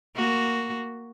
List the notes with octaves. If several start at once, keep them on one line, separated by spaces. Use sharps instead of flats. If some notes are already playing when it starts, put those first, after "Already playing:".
A#3 F#4